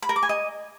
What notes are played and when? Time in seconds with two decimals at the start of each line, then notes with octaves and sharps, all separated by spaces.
0.02 B5
0.09 A#4
0.16 D6
0.23 G#5
0.29 D#5